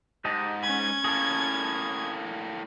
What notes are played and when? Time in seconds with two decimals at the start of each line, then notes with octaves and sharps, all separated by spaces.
0.25 G#2 G4 D#5 A5
0.63 C#4 G#5 B5 G#6
1.04 A2 A#3 G#4 A5